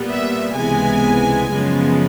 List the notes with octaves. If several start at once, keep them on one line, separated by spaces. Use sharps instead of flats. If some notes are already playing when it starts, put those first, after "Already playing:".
Already playing: A#2 G3 B3
E5
C#2 C3 E3 G#3 B3 G#5
F#2 C#3 F3 G#3 B3